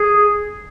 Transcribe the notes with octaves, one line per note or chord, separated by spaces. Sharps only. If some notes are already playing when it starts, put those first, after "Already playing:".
Already playing: G#4